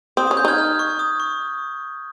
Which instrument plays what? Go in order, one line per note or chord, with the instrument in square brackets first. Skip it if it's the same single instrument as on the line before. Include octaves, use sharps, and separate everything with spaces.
[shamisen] C4 [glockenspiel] D#6
[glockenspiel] D#6
[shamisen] C#4
[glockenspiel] G6
[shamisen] D#4 [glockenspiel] F6 G#6
[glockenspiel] F6
C#6
D#6
C#6